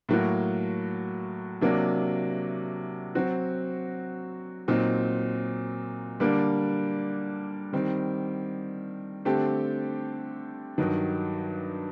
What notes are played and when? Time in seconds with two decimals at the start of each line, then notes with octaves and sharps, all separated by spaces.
0.09 A2 F#3 A#3 F#4
1.61 C3 F#3 A#3 D4
3.15 F#3 C4 F#4
4.68 A#2 F#3 C4 D#4
6.20 D3 G3 A#3 D4
7.73 D#3 G3 C4
9.25 D3 A3 C4 G4
10.78 G2 D#3 F#3